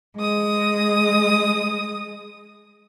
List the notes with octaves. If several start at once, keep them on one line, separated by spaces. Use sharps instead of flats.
G#3 D#6